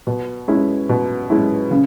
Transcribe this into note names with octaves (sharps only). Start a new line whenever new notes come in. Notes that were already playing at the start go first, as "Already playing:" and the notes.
B2
G#3 C#4 E4
B2
G#3 C#4 E4
C#3